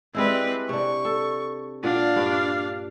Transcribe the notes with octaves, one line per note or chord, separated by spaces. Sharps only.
G3 G#3 C4 E4 B4
C3 D4 C#6
A4
A#2 D4 F5 F#5
G2